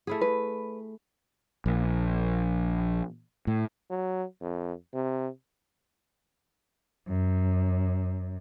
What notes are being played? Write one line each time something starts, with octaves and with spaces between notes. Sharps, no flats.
A3 E4 G#4
B4
A#1
A2
F#3
F2
C3
F#2